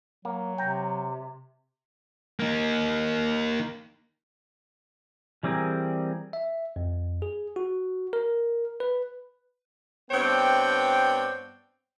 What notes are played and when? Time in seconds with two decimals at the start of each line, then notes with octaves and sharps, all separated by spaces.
0.25 F#3 A#3
0.58 C3 G5 A#5
2.40 A#3 D#4
5.43 E3 G3 C4 G#4 A#4
6.33 E5
6.76 F2
7.22 G#4
7.56 F#4
8.13 A#4
8.80 B4
10.11 G2 B3 C4 C#5 D5 G5